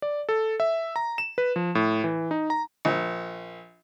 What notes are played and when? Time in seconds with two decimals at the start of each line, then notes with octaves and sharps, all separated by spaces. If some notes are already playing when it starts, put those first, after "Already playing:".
0.02 D5
0.29 A4
0.60 E5
0.96 A#5
1.18 E7
1.38 B4
1.56 F3
1.75 A2
2.04 E3
2.31 D#4
2.50 A#5
2.85 A#1